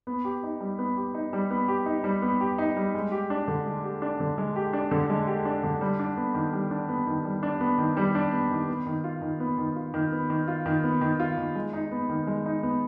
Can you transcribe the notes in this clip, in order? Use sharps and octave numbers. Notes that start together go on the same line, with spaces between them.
B3
G4
D#4
G3
B3
G4
D#4
G3
B3
G4
D#4
G3
B3
G4
D#4
G3
G#3
G4
D4
D3
G#3
G4
D4
D3
G#3
G4
D4
D3
G#3
G4
D4
D3
G3
D4
B3
D#3
G3
D4
B3
D#3
G3
D4
B3
D#3
G3
D4
B3
D#3
B3
D#3
F4
D#3
B3
D#3
F4
D#3
B3
D#3
F4
D#3
B3
D#3
F4
D#3
G#3
D#4
B3
D#3
G#3
D#4
B3